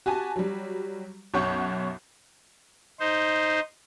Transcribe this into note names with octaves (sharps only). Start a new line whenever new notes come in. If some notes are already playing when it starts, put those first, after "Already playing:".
F#4 G4 G#5 A5
F#3 G3
B1 F#2 C#5 F#5 C#6 G6
D#4 C5